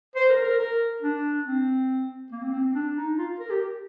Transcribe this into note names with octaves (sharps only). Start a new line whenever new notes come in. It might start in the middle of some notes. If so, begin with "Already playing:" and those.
C5
A#4
A#4
A#4
D4
C4
A#3
C4
C4
C4
D4
D#4
F4
A#4
G4